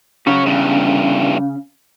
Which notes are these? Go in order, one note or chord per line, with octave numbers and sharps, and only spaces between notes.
C#3 F#4 C#5
E2 G2